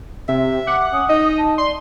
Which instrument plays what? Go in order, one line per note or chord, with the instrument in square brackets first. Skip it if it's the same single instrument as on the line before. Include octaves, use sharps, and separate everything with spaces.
[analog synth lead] C3 [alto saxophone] E5
[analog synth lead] F#5 [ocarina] D6
[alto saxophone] C#4 [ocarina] D#6
[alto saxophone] D#4 [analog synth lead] D#5
[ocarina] A5
[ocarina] D5 [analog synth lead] C6